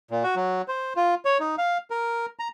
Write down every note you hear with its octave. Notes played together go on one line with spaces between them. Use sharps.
A#2
F#4
F#3
C5
F4
C#5
D#4
F5
A#4
A#5